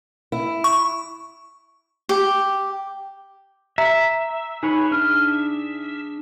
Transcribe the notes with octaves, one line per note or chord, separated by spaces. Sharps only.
E4
C#6
G4
E5 A#5
D#4 G#4 B4 C#5
D4 G#4 F6